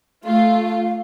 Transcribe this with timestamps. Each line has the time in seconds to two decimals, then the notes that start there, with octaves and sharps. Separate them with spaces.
0.24 A3 F4 F5